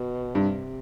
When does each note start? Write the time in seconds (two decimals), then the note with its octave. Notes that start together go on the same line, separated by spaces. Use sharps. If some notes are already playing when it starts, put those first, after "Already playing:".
Already playing: B2
0.35 G2 C3